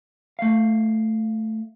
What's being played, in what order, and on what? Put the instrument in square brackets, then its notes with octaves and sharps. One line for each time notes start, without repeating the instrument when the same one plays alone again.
[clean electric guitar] A3 F5